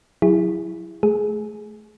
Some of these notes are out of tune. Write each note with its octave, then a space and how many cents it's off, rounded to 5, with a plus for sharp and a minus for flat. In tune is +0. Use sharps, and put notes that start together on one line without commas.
F#3 -15 E4 +5 G#4 -35
A3 -25 G#4 +10